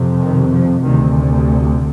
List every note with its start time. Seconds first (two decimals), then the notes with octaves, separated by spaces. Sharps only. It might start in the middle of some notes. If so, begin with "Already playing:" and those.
Already playing: F2 C3
0.22 D#3
0.53 F3
0.83 D2 C3 D#3